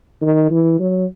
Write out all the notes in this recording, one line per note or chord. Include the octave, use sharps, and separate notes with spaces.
D#3
E3
F#3